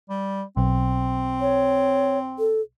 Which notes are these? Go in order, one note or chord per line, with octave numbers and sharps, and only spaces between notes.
G3
B1 C4
C#5
A4